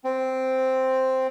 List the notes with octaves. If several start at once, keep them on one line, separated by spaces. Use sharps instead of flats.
C4